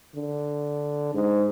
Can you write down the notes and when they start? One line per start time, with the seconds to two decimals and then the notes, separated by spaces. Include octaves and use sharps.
0.15 D3
1.14 G#2